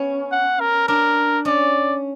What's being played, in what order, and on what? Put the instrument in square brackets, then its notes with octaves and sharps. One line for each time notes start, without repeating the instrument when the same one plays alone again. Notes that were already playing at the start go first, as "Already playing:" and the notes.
Already playing: [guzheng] B3 C#4
[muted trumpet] F#5
A#4
[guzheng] D4 [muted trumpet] A#4
[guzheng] C#4 [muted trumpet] D5